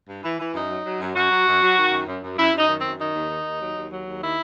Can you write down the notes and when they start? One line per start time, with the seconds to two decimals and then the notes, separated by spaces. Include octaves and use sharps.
0.09 G2
0.24 E3
0.40 E3
0.54 F#2 D#4
0.70 F#3
0.85 F#3
1.00 F#2
1.15 F#2 F#4
1.31 F#3
1.47 F#2
1.62 F#3
1.77 D#3
1.92 F#2
2.08 F#2
2.23 F#2
2.38 F#2 E4
2.53 F#2
2.58 D#4
2.69 D#3
2.79 C4
2.84 F#2
2.99 D#3 D#4
3.15 D#2
3.30 D#3
3.46 D#2
3.61 F#3
3.76 D#2
3.91 F#3
4.07 D#2
4.21 D#3 E4